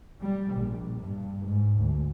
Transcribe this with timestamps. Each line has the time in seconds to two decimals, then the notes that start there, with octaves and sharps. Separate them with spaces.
0.21 G3
0.55 A#1
1.02 G2
1.44 G#2
1.79 D2